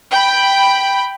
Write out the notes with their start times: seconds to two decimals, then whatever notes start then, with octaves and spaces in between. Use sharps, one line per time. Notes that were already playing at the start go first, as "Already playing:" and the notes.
0.11 G5 B5